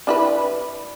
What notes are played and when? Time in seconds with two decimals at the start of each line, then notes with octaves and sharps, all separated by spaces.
0.07 D4 E4 B4